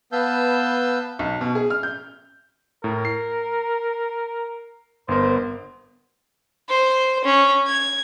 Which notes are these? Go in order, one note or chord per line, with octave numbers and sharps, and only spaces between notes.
B3 B4 F5 A5 E6 G6
B1
B2
G#4
F6
G6
A2 A#4
C7
G1 B3 A#4 C5
C5
C#4
G#6